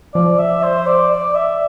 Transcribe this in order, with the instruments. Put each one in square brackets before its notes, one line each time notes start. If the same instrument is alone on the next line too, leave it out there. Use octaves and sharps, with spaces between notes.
[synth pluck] F3 [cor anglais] D5
[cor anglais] E5
C5
D5
D5
E5